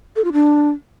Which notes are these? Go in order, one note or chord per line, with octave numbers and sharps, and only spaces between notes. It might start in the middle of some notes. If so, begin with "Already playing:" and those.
A4
F4
D4